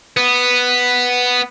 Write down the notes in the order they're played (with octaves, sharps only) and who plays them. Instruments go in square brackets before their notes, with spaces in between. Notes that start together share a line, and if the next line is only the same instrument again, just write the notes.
[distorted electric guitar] B3